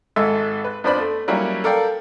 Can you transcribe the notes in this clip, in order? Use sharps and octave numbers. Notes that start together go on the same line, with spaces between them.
G#1 G#2 A4 E5 E6
B4
F2 B3 D4 C5 D5 B5
A3
F#3 G3 A#3 C#4 E4
A4 A#4 D5 F5 G5